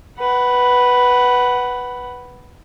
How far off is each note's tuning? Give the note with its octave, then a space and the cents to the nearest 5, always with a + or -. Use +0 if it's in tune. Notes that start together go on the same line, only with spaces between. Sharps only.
B4 +0 F#5 +20